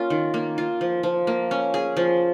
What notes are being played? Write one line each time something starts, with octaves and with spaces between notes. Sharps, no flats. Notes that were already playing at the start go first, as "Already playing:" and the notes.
Already playing: A#3 C#4 F4
D#3
A#3
F4
F3
F3
A#3
C#4
G#4
F3